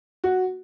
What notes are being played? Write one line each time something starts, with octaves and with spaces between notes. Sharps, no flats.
F#4